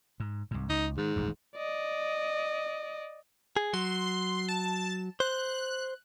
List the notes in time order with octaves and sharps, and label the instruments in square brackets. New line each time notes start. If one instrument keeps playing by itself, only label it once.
[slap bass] G#2
C2 G#2
[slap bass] C#2 [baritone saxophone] D#4
[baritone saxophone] G#2 [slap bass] D#3
[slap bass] D#1 A1 F#2
[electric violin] D5 D#5
[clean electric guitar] G#4
[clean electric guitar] F#3 [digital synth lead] C6
[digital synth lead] A5
[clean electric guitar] C5 [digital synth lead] F#6